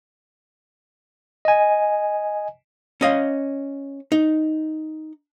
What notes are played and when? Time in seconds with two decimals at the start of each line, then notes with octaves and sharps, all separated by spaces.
1.45 D#5 G#5
3.01 C#4 D#5 F5
4.12 D#4